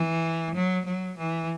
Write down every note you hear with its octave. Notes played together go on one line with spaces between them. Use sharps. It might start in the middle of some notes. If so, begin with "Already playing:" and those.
Already playing: E3
F#3
F#3
E3